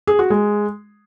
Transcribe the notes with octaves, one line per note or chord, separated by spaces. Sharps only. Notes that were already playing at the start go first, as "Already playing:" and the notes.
G#4
F#4
G#3